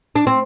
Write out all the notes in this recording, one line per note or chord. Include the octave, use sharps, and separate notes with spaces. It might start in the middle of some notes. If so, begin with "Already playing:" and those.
D4
C4